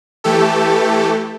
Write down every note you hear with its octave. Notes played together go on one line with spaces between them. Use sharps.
E3 A3 G4 A4